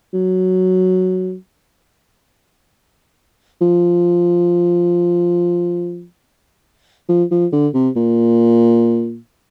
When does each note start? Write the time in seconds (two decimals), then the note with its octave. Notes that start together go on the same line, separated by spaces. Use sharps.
0.13 F#3
3.61 F3
7.09 F3
7.31 F3
7.53 D3
7.74 C3
7.96 A#2